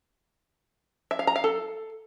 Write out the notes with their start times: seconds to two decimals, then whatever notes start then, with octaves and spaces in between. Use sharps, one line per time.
1.11 E5
1.19 F5
1.27 A#5
1.36 F5
1.44 A4